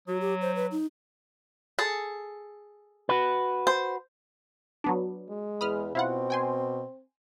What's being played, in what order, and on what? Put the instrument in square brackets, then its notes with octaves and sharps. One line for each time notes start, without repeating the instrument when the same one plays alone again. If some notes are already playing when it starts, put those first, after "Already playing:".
[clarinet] F#3 [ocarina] F#4
[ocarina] G4
C5
B4
D#4
[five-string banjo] G#4 A4
[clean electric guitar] F#4 B4
[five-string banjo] C5
[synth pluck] F#3 B3 D4
[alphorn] G#3
[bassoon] E2 [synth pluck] B5 D#6 F6
[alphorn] B2 [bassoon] C4 [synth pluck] E4 F4 F#5
[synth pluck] G5 G#5 C6